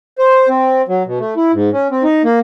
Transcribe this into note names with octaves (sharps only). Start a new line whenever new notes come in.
C5
C4
F#3
B2
A3
E4
G#2
C#4
C4
D#4
A#3